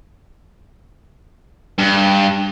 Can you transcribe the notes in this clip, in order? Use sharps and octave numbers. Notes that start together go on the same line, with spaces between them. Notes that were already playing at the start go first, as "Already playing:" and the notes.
G2